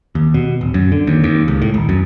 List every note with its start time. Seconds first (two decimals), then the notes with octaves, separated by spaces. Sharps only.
0.15 D#2
0.34 B2
0.61 D1
0.74 F#2
0.92 D3
1.07 D#2
1.24 D#2
1.48 C#2
1.62 A2
1.74 D#1
1.89 F#2